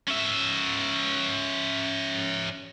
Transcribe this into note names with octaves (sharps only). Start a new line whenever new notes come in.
C#4 E5